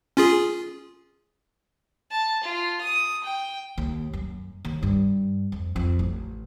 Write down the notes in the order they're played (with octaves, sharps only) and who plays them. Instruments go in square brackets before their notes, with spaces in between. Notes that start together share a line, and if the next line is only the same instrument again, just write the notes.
[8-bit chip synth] C#4 F4 G#4
[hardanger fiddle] A5
F4
D#6
G5
[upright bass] D#2
F#2
D#2
G2
F2
F2
A1